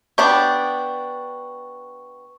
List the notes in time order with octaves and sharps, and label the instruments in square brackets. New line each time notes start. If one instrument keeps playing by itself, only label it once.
[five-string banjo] B3 D4 G4 [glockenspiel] C#6